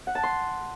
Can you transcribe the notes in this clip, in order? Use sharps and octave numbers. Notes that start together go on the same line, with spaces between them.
F#5
A5
C6